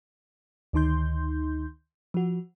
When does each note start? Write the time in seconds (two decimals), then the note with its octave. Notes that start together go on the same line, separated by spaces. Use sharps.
0.73 D2 D#3 D#4 C6 G6
2.14 F3 F#4